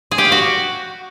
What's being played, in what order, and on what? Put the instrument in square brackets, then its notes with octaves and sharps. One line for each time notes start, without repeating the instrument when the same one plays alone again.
[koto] G#4
G4
F5
F#4